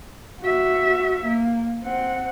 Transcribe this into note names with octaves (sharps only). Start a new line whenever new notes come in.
F#4 E5
A#3
C4 F#5